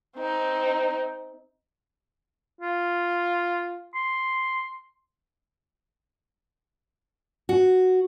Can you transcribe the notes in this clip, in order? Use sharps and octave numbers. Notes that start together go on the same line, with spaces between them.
C4 D#4
F4
C6
F#4